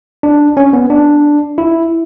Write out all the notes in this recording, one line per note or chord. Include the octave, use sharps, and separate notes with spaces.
D4
C#4
B3
D4
E4